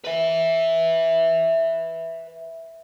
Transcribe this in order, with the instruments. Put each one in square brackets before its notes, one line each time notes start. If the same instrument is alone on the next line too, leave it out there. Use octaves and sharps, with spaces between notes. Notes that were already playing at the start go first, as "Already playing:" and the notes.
[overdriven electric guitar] B4 E5